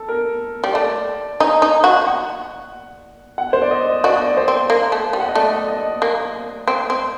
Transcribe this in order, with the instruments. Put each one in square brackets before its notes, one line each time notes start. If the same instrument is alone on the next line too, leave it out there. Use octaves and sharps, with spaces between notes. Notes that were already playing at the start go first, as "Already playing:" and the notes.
Already playing: [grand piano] A4
A#4
[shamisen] G3
[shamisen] A3 [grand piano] D5
[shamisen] D#4 [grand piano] D#5
[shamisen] D#4
F#4
[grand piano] F#5
F#5
C5
D5
D#5
D#5
[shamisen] F#4 [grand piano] D5
[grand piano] D#5
D5
C5
[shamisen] C4
A#3
A3
G3
[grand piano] F#5
D#5
[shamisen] A3 [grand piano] D5
[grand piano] D#5
[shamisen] A#3
C4
C4